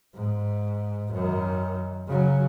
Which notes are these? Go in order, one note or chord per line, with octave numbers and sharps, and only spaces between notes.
G#2
F#2 D#3
C#3 F#3